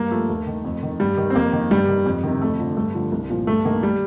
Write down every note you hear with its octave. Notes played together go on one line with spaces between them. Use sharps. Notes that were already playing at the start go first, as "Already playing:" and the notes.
Already playing: G2 A#3
F3 A3
D#2
D#3
F2
D#3
G2 G3
D#3
C4
F2 A#3
D#3
G2 G3
D#3
F2
C3 D#3
F2 A3
D3 F3
G2 A3
D3 F3
C2
A#2 F3
G2 A3
D#3 A#3
G3